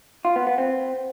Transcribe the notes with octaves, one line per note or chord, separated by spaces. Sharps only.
F4
B3
B3
C4